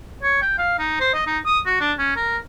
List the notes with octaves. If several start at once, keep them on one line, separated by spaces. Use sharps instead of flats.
C#5
G5
F5
D#4
C5
D#5
D#4
D#6
F#4
D4
C#4
A#4